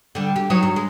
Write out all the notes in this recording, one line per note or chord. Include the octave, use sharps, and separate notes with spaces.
D3 G3
G4
F#3 D#4 C#5
G2 F#3
G#3